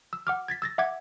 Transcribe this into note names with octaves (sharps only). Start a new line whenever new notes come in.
E6
F#5 D6 F6
G#6 A6 B6
E6 A6 A#6
E5 F#5 D6 G#6